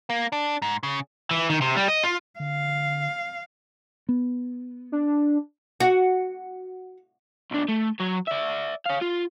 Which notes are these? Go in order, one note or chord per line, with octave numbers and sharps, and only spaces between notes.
A#3
D4
G#2
C#3
E3
D#3
C3
G3
D#5
F4
D3 F5
B3
D4
F#4
B1 D4
A3
F#3 C#5
D5 E5
C#5 F5
F4